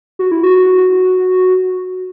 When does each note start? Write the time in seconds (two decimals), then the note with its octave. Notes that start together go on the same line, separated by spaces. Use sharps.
0.19 F#4
0.31 E4
0.43 F#4